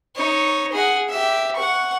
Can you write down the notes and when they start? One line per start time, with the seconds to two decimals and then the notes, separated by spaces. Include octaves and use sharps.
0.16 D#4 C#5
0.72 G#4 F#5
1.09 G4 E5
1.56 F#5 C#6